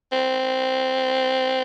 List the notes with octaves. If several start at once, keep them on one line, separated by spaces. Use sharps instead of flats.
C4